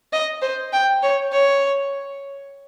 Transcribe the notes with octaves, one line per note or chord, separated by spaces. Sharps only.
D#5
C5
G5
C#5
C#5